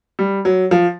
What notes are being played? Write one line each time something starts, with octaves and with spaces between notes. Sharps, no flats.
G3
F#3
F3